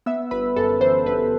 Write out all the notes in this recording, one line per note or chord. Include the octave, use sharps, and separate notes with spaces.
B3 E5 E6
G1 B4 B5
F#2 A4 A5
E3 C5
G1 B4